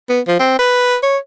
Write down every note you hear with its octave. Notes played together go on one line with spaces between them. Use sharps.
B3
F3
C4
B4
C#5